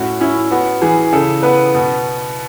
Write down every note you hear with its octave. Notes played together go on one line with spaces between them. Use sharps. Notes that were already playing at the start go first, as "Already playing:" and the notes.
Already playing: A2 C#4 F#4
C#4 E4
B3 F#4
E3 G#4
C#3 A4
B3 B4
B2